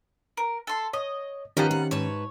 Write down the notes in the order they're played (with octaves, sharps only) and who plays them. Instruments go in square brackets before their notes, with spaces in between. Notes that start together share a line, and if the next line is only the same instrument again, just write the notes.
[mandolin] A#4
A4 C6
[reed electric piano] C#5 [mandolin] D#5
[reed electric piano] D#3 C#4 [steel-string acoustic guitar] F3 G4 [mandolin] B3 F5 A#5
[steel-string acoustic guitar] C3 F#5
[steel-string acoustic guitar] G#2 B4 A5 [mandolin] C#5